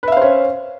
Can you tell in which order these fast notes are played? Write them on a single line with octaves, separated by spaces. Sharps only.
B4 E5 F5 C5 C#4